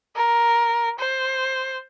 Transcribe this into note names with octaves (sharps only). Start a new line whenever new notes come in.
A#4
C5